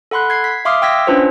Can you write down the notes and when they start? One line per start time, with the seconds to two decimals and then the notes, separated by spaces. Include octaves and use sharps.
0.11 A4 F#5 B5 C6 F#6
0.30 G#6 C7
0.44 B6
0.65 E5 F5 C6 D6 D#6 F6
0.82 G5 C6 E6 G#6 A#6 B6
1.07 C#4 D4 F4 B4 C5